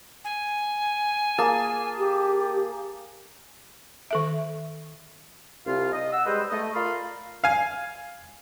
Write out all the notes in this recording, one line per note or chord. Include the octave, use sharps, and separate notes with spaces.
G#5
A#3 G#4 A5
G4
D#3 A4 E5
C2 F4 F5
D#5
F#5 E6
G3 G#3 G4 B4 C5 D#5
A3 D#5
F4 A#4 D5 B5 C6 F6
F5 G#5